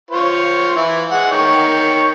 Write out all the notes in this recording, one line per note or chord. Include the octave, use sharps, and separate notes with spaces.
F4 C5 C#5
E3 E4
G#3 F#5
D#3 C#5 G5